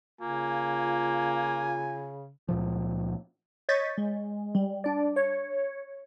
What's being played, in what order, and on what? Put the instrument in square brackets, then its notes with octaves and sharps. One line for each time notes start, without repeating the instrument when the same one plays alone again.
[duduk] C#3 [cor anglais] A#3 [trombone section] F4 [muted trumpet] G#5
[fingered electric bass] C#2 A#2 F3
[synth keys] C#5 D#5 C#6 G6 A6 B6
G#3
G3
D4 D5
C#5